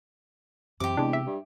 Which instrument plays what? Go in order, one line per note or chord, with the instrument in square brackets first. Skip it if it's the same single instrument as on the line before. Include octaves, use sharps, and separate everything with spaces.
[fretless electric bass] F#2 E3 [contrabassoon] C3 [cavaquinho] G4 D6
[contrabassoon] E2 [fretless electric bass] C3 C4 [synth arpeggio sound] G#3 D4
[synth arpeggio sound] E5
[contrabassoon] G2